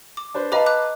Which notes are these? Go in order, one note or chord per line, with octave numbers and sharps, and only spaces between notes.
D6
D4 B4 C5
B4 D#5 F5 A5 A#5 D6
D6 F#6